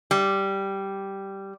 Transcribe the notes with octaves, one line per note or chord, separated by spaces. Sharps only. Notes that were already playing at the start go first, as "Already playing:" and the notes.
G3